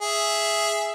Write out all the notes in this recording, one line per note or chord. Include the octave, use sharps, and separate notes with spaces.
G#4 E5